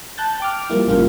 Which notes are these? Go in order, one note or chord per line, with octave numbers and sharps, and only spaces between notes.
A5 F#6 G6 A6
G5 D6 F6
F3 G3 A#3 E4
A1 G2 C#3 A#3 F4 F6